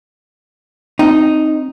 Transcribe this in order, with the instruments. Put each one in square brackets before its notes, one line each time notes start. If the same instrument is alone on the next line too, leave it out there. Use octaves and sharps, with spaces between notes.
[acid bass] C4 [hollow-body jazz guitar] D#4